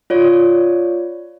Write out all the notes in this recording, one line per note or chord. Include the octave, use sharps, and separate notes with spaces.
F4 C#5 D5